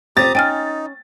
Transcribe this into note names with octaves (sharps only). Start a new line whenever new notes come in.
C4 G4 A#5 D#6 A6
C#4 D#4 G5 G#5 F6